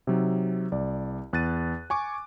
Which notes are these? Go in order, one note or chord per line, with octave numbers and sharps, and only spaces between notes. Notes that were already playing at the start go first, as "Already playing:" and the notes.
C3 F#3 D#4
C2 D5
E2 F#6 A6 D#7
G#5 C#6 D6